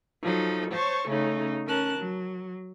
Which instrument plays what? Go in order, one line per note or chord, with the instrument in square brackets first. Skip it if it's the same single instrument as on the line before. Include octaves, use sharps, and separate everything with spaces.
[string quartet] F3 F#3 D#4 A4
C5 C#5 A5 C#6
C#3 A3 C#4 D#4
C#4 A#4 A5 F#6
F#3